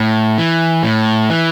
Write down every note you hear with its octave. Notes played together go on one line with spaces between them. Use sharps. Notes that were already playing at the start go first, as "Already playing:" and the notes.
Already playing: A2
E3
A2
E3